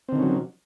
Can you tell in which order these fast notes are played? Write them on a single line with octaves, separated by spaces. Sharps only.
C4 D3 D#3 C#4 F#3